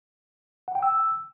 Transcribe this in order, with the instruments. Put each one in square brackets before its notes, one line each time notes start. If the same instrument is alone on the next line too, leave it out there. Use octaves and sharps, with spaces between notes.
[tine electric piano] F#5
G5
E6